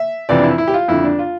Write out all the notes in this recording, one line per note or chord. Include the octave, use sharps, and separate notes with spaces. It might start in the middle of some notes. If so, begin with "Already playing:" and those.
Already playing: E5
F2 C3 E3 D5
D4
E4
E4
G4
F4
F2 D3 E4
D4
F4